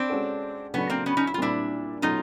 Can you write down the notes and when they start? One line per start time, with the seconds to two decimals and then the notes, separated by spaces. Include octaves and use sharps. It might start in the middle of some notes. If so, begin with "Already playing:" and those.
Already playing: C4 D4
0.10 G#3 C#4 F#4 A4
0.74 C#3 F#3 A3 B3 C#4 D4
0.90 A#3 C4
1.06 B3 C#4
1.17 C#4 D#4
1.27 E4
1.34 F4
1.38 A#2 G3 C4 D4 E4
2.02 B2 F#3 A3 C#4 D#4 F4